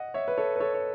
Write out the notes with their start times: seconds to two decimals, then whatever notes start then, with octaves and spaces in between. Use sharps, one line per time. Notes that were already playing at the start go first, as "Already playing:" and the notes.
Already playing: D#5 F#5
0.14 C#5 E5
0.28 B4
0.37 A4 C#5
0.56 B4
0.60 A4 C#5
0.74 C#5